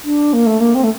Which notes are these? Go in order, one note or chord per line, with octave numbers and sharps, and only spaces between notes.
D4
A#3
A3
A#3
C4
A3